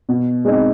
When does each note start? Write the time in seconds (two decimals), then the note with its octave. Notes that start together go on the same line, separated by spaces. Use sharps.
0.09 B2
0.45 G#3 C4 D#4